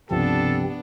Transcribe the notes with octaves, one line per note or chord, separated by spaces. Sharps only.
C#2 G2 C3 F3 B3 C4 D4 A4